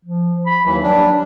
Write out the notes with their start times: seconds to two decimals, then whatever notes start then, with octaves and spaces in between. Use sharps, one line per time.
0.05 F3
0.46 B5
0.65 D#2 E3 F#3
0.83 G3 D4